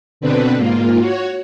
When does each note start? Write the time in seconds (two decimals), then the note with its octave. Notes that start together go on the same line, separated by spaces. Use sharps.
0.21 B2 D3 C4 D4 B4
0.57 G#2 A#3 F4
1.00 F#4 C#5